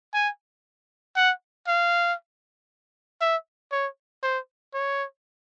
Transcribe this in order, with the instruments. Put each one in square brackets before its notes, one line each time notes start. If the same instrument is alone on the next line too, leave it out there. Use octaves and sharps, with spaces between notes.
[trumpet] G#5
F#5
F5
E5
C#5
C5
C#5